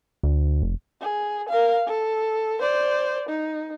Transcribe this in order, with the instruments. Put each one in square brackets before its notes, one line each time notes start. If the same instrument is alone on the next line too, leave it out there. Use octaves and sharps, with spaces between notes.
[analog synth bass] D2
F1
[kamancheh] G#4
A#4 F5
A4
C5 D5
D#4